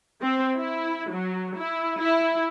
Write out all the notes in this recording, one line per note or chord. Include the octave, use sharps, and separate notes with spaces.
C4
E4
F#3
E4
E4